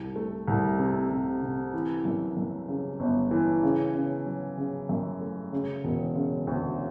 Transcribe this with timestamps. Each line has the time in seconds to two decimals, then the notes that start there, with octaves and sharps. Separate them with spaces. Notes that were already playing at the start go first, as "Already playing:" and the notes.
Already playing: C2
0.16 A3
0.48 C2
0.79 C3
1.11 C3
1.43 C3
1.74 E3
2.05 F#2
2.37 F#2
2.68 C#3
3.00 G1
3.31 E3
3.63 C#3
3.95 C#3
4.26 F#3
4.57 C#3
4.89 F#2
5.21 A3
5.52 C#3
5.84 E1
6.16 C#3
6.47 D2